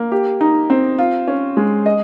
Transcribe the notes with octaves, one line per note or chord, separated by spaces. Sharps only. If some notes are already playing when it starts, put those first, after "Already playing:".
Already playing: A#3
G4
D#4
C4
F4
C#4
G#3
D#5